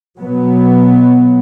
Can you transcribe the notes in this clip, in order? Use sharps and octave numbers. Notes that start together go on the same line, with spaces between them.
B2 F#3 B3